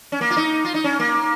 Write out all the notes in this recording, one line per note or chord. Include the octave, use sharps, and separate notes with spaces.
C#4
A#3
F4
D#4
F4
D#4
C#4
A#3